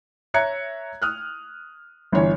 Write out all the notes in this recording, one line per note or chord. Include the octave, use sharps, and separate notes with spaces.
C#5 E5 A#5 F#6 G#6 C#7
D#6 F6 F#6
G1 E3 C#5